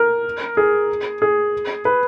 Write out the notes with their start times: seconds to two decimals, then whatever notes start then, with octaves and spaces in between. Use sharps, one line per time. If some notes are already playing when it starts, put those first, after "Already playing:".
Already playing: A#4
0.57 G#4
1.22 G#4
1.85 B4